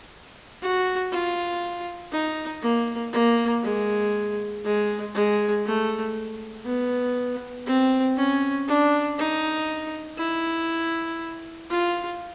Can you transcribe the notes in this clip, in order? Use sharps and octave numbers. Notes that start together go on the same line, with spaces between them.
F#4
F4
D#4
A#3
A#3
G#3
G#3
G#3
A3
B3
C4
C#4
D4
D#4
E4
F4